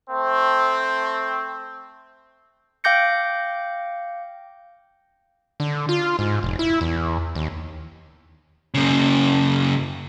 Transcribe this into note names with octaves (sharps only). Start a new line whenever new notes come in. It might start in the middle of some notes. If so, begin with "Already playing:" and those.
A3 C4
F5 G5 D6 G6 A#6 C#7
D3
F4
G#2
F1
E4
E2
D#2
F#2 C#3